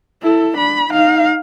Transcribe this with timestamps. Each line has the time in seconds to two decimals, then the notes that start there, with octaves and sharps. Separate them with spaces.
0.22 E4 A4
0.57 D4 B5
0.89 D#4 F5